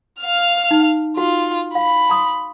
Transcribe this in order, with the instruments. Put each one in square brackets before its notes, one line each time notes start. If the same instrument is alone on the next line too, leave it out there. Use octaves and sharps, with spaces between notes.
[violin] F5 F6
[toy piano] D#4
[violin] F4 [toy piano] F#4
[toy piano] F5 [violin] B5
[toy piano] A#5 C6 D#6